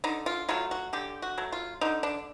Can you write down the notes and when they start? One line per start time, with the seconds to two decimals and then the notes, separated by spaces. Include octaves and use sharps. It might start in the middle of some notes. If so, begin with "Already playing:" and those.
0.04 D3 D#4
0.26 F4
0.49 F#3 A3 F4
0.71 F#4
0.93 D3 G4
1.22 F#4
1.38 F#3 A3
1.52 F4
1.81 D3 D#4
2.03 D4